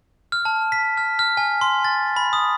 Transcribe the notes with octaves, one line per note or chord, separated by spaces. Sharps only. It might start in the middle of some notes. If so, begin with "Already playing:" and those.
F6
A5
B6
F6
F6
G#5
C6
A6
B5
D#6